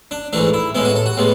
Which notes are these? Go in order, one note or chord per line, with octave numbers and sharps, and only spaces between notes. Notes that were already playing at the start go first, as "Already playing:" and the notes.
D4
G#2 E3 A3 D4
E4
A2 G#3 B3 E4
F#4
A4
F#4
A2 G#3 B3